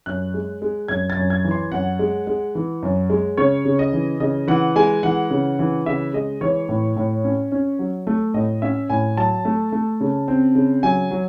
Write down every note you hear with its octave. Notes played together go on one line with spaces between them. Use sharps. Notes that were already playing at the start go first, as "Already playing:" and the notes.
F#2 F#6
G#3
G#3
F#2 G#6
A6
F#2
G#6
E3
C6
F#2 F#5
G#3
G#3
E3
F#2
G#3
C#3 C#5
C#3
D#5
E3
C#3 D#5
E3 F#5
G#3 G#5
E3 F#5
C#3
E3
C#3 E5
G#3 D#5
E3 C#5
A2
A2
C#4
C#4
F#3
A3
A2 D#5
C#4 E5
A2 G#5
F#3 A5
A3
A3
C#3
C4
C#3
F#3 G#5
F#3